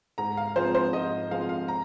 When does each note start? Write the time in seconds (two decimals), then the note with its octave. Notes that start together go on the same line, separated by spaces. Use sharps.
0.18 G#2 A#5
0.37 F5
0.56 F3 G#3 C4 F4 C5
0.75 C5
0.93 G#2 D#5
1.31 F3 G#3 C4 F4 F5
1.49 F5
1.68 A#5